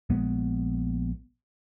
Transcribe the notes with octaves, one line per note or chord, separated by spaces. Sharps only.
A#1 G#3 B3